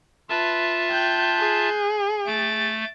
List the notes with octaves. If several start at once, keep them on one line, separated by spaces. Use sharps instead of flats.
F4 B4 E5 A5
G5 F#6 G6
G#4
A3 A6 D7